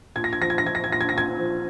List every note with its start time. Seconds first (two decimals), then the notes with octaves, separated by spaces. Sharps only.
0.15 A#2 G#6
0.24 A#6
0.33 G#6
0.40 F3 A#6
0.50 G#6
0.58 A#6
0.65 F3 G#6
0.75 A#6
0.84 G#6
0.90 A#2 A#6
1.01 G#6
1.09 A#6
1.13 A#2 G#6
1.38 F3